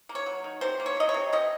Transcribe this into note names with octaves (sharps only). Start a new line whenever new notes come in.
A#3
C#5
F#3
D#3
C3 C5
A#3
C#5
F#3 D#5
C#5
C3
C3 D#5